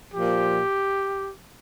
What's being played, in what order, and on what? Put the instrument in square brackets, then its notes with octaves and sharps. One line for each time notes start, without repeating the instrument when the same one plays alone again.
[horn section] A#2 F3 G4